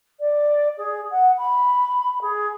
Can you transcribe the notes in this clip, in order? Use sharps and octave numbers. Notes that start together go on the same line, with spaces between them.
D5
G#4
F#5
B5
G#4